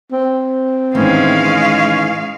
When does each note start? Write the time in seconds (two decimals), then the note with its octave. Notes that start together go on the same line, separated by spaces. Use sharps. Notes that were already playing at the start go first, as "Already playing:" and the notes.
0.12 C4
0.95 A2 D#3 E3 G#3 C#4 F5